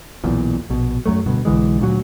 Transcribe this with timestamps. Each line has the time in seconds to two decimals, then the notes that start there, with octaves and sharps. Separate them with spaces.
0.24 B1 E2 A#2
0.70 A#1 B2
1.06 F#2 F#3 A3
1.26 D1 G1 G2 B2
1.45 B1 D3 E3 G#3
1.80 D2 A#2 F#3